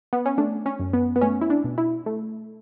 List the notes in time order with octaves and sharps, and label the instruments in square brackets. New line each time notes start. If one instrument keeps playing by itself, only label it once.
[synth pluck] B3
C#4
A3 D4
C#4
F#2
B3
B3
A3 C#4
E4
D4
B2
E4
A3